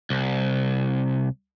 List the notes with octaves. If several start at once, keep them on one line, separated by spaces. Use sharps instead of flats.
C2